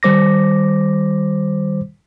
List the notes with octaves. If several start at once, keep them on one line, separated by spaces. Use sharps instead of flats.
D#3 G3 C5 D6 A#6